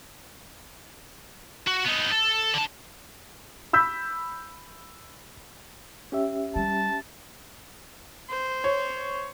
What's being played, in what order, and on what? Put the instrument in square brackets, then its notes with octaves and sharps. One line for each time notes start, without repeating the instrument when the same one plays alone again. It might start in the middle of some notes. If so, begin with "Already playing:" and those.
[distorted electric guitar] F#4
B3 D#4
A4
D3 A5
[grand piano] B5 E6 G6 B6
[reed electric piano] C#4 G4 E5
[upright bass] G3 [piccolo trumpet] A5
[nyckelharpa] C5
[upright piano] C#5